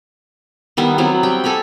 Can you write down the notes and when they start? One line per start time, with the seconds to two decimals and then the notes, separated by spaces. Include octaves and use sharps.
0.77 D#3 G3 B3 E4
0.98 F#3 B3 C4 E4
1.23 G3 G5
1.44 A4 G#5 A#5 B5